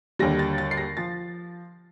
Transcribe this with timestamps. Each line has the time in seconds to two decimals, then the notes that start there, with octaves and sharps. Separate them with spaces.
0.19 D#2 D3 G3 A#6
0.39 A6
0.58 A6
0.71 C7
0.77 A#6
0.97 F3 A6